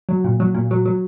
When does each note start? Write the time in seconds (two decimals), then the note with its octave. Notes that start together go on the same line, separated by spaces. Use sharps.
0.09 F#3
0.24 A#2
0.40 F#3
0.54 A#2
0.71 F#3
0.86 F#3